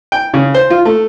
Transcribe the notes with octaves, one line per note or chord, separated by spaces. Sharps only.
G5
C#3
C5
F4
A3